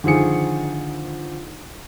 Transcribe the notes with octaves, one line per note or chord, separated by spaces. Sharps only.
D3 D#3 F3 G#4 C#7